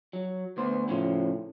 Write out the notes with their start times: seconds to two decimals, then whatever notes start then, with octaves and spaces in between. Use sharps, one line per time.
0.13 F#3
0.57 D2 B3 C5
0.89 A2 C#3 F3